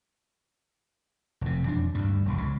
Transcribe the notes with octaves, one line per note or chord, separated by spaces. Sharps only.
F1 C3
E1 F2 D4
D2 G2 G3
E1 A#1
C#2 C#3